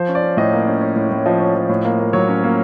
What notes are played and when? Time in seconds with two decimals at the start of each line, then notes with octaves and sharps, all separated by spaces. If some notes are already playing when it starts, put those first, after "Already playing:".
Already playing: F3 C5
0.08 C#4
0.15 D5
0.23 C#4
0.37 A2 D#5
0.53 A#3
0.67 C#4
0.81 C#4
0.96 A2
1.11 A2
1.26 F3 D#5
1.40 C#4
1.55 F3
1.69 A2
1.84 A#3
1.99 A#3
2.13 F#3 C#5
2.29 C#4
2.44 A#3